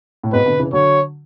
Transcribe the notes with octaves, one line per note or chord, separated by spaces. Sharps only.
A2
G#2 B2 B4
B2 D3
C#3 E3
D3 F#3 C#5